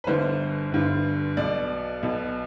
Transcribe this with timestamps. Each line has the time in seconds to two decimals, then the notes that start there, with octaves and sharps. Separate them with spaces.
0.04 B4
0.07 G1 G2 D3 C5
0.72 G1 G2 D3
1.37 B1 B2 D5
2.03 B1 B2